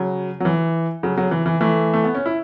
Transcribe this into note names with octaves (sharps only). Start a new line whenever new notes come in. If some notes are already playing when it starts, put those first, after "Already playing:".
Already playing: C#3 F#3
F#3
E3
C#3 F#3
C#3 F#3
E3
E3
E3 A3
A3
B3
C#4
E4